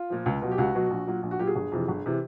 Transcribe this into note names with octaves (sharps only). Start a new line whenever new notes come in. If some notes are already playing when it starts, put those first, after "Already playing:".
Already playing: F4
A#2 F3
C#2
B2 F#3
G4
C#2 F#4
B2 F#3
A#1
A#2 F#3
A#1
F#4
A#2 F#3 G4
G#4
G1
F2 C3 E3
G1
C3 E3